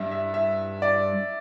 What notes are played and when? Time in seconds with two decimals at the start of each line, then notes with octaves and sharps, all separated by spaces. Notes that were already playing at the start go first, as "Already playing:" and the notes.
Already playing: G2 E5
0.11 E5
0.34 E5
0.82 D5